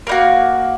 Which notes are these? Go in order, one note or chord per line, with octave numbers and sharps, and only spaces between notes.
A#3 D#4 F#4